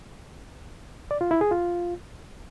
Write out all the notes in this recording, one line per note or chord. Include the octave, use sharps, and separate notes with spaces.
D5
F4
E4
G#4
F4